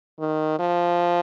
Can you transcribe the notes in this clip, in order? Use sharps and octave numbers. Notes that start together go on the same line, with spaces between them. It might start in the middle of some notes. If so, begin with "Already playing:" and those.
D#3
F3